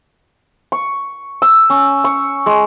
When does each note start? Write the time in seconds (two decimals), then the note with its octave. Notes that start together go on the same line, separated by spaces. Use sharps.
0.72 C#6
1.42 E6
1.70 C#4
2.04 C#6
2.46 G#3